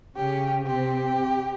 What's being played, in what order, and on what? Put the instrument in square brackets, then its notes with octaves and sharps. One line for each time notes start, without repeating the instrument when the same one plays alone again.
[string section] C#3 C#4 [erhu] G4
[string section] C3 C4 [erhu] G4